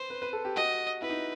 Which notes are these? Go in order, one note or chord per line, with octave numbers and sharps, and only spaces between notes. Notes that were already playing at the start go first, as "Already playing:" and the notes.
Already playing: B4 C5
B4
B4
A4
G4
F#4 D#5
E4 B4
D#4